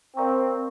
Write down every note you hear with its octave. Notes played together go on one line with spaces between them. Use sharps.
C4 A#4 D5 F5 A#5 C#6